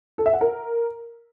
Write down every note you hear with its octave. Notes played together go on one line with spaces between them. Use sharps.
A4
E5
F#5
A#4